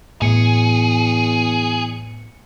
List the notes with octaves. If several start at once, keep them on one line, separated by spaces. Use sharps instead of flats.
E2 A2 G#4 C#7